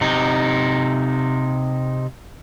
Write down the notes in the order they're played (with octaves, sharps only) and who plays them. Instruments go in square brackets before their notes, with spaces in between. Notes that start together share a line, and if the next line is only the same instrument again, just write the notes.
[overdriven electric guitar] C3 D#4